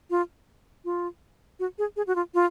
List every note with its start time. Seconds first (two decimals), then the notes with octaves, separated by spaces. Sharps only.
0.10 F4
0.85 F4
1.60 F#4
1.78 G#4
1.96 G#4
2.07 F#4
2.15 F4
2.34 F4